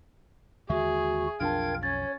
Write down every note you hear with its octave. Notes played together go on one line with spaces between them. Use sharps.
D#2 D3 G#3 F#4 G#4 E5
B1 F2 D4 F4 A#4 G5 A5 G#6
C#4 C#5 G#6 A6